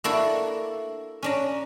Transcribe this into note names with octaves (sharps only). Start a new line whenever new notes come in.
A#3 D4 E4 F#4 A4
C#4 D4 A#5